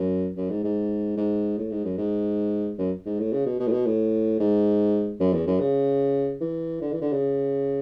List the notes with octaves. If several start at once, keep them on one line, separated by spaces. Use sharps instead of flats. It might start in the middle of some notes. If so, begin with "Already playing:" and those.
Already playing: F#2
F#2
G#2
G#2
G#2
A2
G#2
F#2
G#2
F#2
G#2
A2
C#3
B2
B2
A2
B2
A2
G#2
F#2
E2
F#2
C#3
E3
D3
E3
D3
C#3